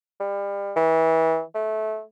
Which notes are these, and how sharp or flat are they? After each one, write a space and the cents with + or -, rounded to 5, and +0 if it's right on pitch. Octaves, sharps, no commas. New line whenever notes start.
G3 +30
E3 -25
A3 -20